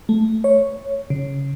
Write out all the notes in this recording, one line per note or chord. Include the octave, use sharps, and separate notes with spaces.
A3
C#5
C#3